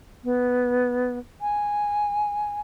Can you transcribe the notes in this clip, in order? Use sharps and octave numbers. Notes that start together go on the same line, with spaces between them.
B3
G#5